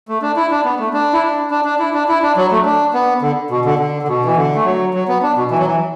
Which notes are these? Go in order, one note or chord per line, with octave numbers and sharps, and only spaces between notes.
A3
D4
E4
D4
B3
A3
D4
E4
D4
D4
D4
E4
D4
E4
D4
F#3
A3
D4
B3
D3
B2
D3
D3
D3
B2
E3
D3
A3
F#3
F#3
B3
D4
B2
E3
F#3
E3